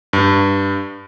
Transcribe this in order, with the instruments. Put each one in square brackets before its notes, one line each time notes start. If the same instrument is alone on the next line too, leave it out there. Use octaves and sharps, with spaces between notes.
[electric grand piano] G2